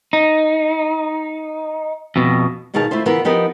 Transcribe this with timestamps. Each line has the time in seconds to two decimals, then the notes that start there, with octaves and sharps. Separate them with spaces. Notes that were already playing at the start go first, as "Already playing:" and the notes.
0.13 D#4
2.16 F2 B2
2.74 D#2 B2 D#3 G#4 F5 A5
2.91 A3 E4 F4 C5
3.06 C#3 E3 B3 F4 A#4 B4
3.25 F3 B3 D#4 G4 A#4 D#5